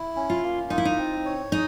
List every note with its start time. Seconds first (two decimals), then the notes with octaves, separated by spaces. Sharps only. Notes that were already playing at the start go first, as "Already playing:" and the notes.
Already playing: E4
0.16 C#4
0.30 F4
0.43 A#3
0.70 D#4 F4
0.78 E4
0.85 D#4
0.98 C4
1.25 C#5
1.52 D#4 G#4